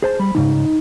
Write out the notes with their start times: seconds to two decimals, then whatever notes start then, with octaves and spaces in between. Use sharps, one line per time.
0.02 G#4 C5 A5
0.19 G3 B5
0.35 D2 G#2 C#3 D#4